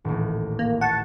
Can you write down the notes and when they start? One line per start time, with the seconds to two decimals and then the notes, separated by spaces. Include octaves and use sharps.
0.05 D#1 A1
0.59 A#3
0.81 F#5 A5 C#6 G6